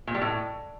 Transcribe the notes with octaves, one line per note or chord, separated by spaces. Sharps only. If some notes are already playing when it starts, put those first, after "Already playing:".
A#2
G3
A2